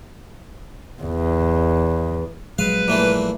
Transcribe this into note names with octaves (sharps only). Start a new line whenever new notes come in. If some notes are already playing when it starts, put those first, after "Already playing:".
E2
A#1 F#3 G#3 B4 F5
A#2 E3 A3